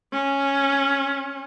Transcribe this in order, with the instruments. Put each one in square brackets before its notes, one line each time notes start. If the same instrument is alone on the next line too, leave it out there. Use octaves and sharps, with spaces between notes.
[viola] C#4